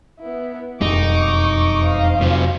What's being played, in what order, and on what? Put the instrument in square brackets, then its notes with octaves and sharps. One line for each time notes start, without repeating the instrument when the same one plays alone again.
[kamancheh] B3 E4
[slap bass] E1 B1 G3 [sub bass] F2 [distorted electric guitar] D#4 [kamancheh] C#6 D6
[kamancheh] C5 F5
[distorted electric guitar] C3 F4 [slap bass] F#3